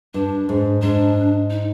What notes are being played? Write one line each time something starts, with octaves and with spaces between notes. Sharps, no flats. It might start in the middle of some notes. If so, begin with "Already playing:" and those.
G2 D4
G#2
G#2 D4
D#4